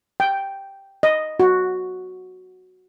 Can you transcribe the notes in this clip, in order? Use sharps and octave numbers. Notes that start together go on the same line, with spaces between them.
G5
D#5
F#4